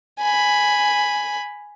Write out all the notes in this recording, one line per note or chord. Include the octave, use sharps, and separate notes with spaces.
G#5 B5